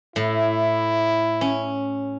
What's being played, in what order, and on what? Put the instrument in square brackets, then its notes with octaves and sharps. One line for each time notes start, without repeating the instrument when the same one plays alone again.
[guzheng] A2 [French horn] E4
[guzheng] C#4